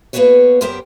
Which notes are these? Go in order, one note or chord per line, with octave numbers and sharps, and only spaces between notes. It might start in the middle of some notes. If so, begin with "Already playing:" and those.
A#3 B3 F#4 G#4 B4 C#5
F#2 B3 G4 A#4 C5 G5